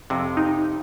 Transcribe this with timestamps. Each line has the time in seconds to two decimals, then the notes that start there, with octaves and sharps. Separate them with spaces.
0.10 F2 C3
0.37 D#4